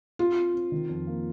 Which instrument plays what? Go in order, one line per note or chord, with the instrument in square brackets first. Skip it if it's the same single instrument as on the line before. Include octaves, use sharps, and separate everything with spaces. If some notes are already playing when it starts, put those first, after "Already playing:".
[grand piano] C4 [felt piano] F4
[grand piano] C4
C4
D#3
F2
A#3